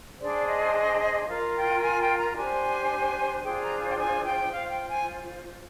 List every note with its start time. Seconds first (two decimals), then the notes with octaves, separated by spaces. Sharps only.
0.21 D4 G#4 C5 D5
0.47 D#5
1.28 F4 A#4 F5
1.56 G5
1.82 G#5
2.00 G5
2.18 A#5
2.36 D4 G4 C5 G#5
3.44 D4 F4 G#4 C5 G5
3.62 A#5
3.80 G#5
3.91 G5
3.98 G#5
4.25 G5
4.52 F4 C5 F5
4.70 G5
4.88 G#5